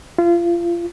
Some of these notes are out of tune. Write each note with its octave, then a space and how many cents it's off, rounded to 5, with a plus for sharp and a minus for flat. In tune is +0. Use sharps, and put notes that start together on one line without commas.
F4 -30